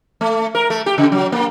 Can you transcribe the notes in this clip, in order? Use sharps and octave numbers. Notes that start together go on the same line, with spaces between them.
A3
A#4
A3
G4
C#3
F#3
A#3